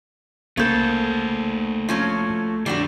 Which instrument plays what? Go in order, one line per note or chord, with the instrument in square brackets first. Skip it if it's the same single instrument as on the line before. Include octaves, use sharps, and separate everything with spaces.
[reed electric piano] C2 A#3 G6 [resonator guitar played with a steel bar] C#3 A4 [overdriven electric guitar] A3 C5
[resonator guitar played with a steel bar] F3 F#3 C#4
[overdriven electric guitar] F2 D3 [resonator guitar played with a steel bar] G3 D4 F#4